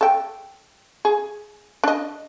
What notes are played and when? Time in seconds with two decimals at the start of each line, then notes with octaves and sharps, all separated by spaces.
0.01 A4 G5
1.05 G#4
1.84 D4 D#5